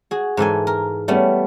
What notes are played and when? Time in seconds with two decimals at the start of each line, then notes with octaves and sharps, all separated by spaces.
0.11 F#4 G#4
0.37 G#2 E3 A4 G#5
0.67 A#4
1.08 G3 A3 B3 C#4